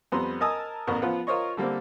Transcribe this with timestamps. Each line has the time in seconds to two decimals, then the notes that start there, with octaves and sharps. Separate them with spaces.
0.12 F2 G3 B3 A#5 C6
0.41 A#4 D#5 G#5 A5 D#6 E6
0.87 A1 E2 B3 A#4 C#6
1.02 F3 B3 F4 F#5
1.27 F4 A#4 C5 C#5 D#5 C#6
1.57 D3 G3 A#3 C4